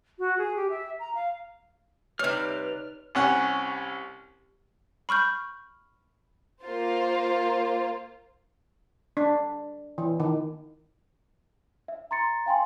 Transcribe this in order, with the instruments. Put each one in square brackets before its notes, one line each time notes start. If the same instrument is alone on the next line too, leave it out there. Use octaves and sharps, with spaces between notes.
[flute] F#4
G#4
G4
E5
A#5
F5
[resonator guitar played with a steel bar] C3 G3 [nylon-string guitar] D#4 C#5 [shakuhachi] B4 [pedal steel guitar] F6
[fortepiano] C2 C#4 F#5
[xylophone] B5 C#6 F6 G6
[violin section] A#3 F4 C5
[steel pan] D4
E3
D#3
[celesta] E5
A#5 C6 A6 C#7
F5 G5 G#5 C6